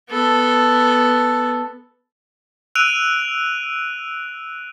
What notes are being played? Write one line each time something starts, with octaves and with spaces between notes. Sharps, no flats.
B3 A4
E6 F#6 D7 D#7 F7